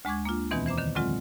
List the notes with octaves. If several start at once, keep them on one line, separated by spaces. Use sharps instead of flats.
D2 G#3 C#6 D6 G#6
A#3 D4 F4
E2 B2 D#3 E3 B3 C4
E3 C5 E5 A#5 D6
D3 D#3
A2 D3 F#3 G#3 C4 F4